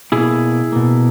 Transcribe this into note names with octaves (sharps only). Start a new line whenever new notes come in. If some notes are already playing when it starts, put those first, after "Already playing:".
B2 A#3 E4 G#4
B2 A#3